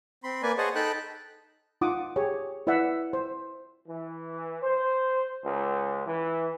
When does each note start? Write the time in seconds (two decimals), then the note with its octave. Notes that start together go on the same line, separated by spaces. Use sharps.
0.24 C4 B5 C6
0.43 A#3 B4 D5 G#5
0.58 G#4 C5 C#5 D#5 F#5 A5
0.75 D#4 A4 G5 A5 B5 F#6
1.81 D#4 F4 F#5 D6 D#6
2.16 G4 G#4 C#5
2.67 E4 B4 D5 E5 F#5
3.13 C5
3.89 E3
4.62 C5
5.44 C#2
6.06 E3